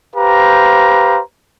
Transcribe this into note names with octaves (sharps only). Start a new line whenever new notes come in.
G4 B4 C5 F5 A#5